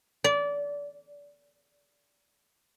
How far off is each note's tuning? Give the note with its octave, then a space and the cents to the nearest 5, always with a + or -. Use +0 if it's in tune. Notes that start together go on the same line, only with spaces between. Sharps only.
D5 -25